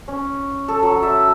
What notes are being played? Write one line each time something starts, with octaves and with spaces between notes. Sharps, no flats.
C#4
A4
F#3
E5